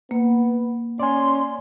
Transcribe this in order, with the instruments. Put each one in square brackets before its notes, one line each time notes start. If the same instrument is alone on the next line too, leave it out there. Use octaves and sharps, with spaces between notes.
[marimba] A#3 [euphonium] B3
[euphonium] C#4 [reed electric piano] D5 G#5 [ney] C6